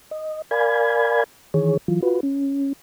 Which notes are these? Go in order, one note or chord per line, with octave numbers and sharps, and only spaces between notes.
D#5
A#4 D5 F5 G#5 B5 G#6
D#3 E3 G#4 C#5
E3 F#3 F4
F4 F#4 B4
C#4